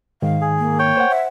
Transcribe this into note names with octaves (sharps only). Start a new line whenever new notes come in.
G#2 D#3 F5
G#4
A#3
C#5 G5
C5 F#5
E5